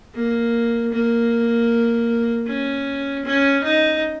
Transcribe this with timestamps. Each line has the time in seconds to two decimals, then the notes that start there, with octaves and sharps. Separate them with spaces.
0.15 A#3
0.92 A#3
2.47 C#4
3.25 C#4
3.63 D#4